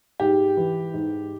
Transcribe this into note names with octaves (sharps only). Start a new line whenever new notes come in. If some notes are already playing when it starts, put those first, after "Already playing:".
G#2 G4
E3
G#2